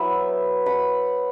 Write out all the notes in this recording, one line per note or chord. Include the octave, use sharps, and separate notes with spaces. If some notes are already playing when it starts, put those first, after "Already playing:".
Already playing: F#3 B3 E4 B4 E5
F#5 B5